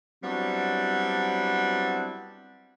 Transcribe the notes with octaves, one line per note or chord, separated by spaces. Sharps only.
F#3 G3 B3 C4 D4 E4